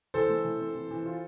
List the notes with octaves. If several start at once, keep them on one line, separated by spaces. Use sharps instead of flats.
E3 A4 C5
A3
E3
C4
E3
E3
F4